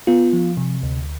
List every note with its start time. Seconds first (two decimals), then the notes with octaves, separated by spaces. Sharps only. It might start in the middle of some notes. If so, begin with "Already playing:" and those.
0.07 B3 F4
0.33 F3
0.57 C3
0.83 D2